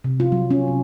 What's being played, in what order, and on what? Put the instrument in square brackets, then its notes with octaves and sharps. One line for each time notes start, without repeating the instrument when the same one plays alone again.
[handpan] C3
F4
F#3
C#4
C3